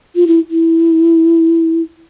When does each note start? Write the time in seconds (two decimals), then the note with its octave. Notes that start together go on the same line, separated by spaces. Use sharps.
0.16 F4
0.27 E4
0.51 E4